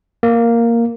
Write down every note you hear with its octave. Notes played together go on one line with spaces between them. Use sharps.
A#3